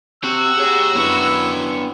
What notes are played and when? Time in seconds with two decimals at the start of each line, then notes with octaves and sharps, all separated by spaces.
0.24 C4 F#4 G4 E6
0.58 G4 G#4 C#5
0.95 F#2 B3 D4 E4 B4 C#5